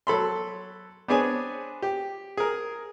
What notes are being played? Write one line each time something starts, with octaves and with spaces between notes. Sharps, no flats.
F#3 A4 B5 C6
B3 C4 D4 G#4 C#5 G#5
G4
G#4 A#4